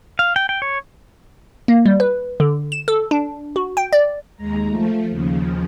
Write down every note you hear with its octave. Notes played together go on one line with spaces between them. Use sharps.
F5
G5
G5
C#5
A#3
G3
B4
D3
E7
A4
D4
F#4
G5
D5
D#2 G#3 A#5
F3 A3
D#2 C#3 F3